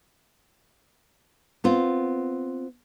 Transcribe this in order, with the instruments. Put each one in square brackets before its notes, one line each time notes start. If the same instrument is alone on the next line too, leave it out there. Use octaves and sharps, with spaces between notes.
[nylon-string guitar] B3 C4 F4